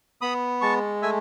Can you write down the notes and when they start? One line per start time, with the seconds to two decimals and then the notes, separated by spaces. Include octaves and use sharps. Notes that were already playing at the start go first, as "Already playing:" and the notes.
0.21 B3 B5 D#6
0.61 G#3 A5 C#6
1.02 A3 E5 G#5